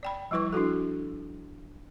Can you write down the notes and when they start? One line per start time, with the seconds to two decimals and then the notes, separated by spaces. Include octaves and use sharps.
0.03 D5 G5 B5
0.31 F3 G3 E4 B4 C#6
0.53 D4 E4 F#4 A4